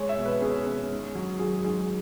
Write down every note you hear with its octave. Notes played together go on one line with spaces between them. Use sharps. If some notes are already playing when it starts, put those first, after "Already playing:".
Already playing: G#3 C#5
E5
B2
B4
C#4 G#4
C#4
G#2
F#3
F#3 G#4
G#2 G#4